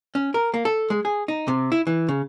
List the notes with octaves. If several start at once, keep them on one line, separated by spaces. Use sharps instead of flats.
C#4
A#4
A#3
A4
G#3
G#4
D#4
C3
E4
E3
C#3